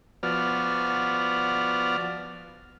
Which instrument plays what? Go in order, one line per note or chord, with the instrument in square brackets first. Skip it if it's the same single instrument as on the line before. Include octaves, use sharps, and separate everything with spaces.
[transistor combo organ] F3 B3 F#4 D5 F6